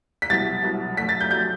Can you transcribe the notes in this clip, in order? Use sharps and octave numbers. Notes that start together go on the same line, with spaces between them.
B6
C2 B2 F#3 A6
C2 B2 F#3
F#2 F#3 A3 B6
A6
G6
F#3 A3 G6